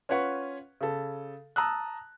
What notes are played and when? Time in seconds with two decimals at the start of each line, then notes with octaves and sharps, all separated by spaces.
0.09 C#4 F4 B4 C#5 F#5 C#6
0.81 C#3 A4
1.56 A5 A#5 D#6 E6 F#6